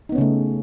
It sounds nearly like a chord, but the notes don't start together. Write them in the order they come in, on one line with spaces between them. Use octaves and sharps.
D#4 B3 C#4 C#3 A3